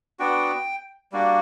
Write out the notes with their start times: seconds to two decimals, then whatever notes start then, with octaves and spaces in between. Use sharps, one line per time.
0.19 B3 D4 F#4 G5
1.12 G3 A#3 D4 F#4